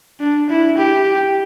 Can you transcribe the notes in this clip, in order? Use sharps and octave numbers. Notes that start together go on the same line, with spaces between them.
D4
E4
G4